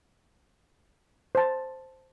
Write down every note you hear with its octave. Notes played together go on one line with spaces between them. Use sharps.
C5 A5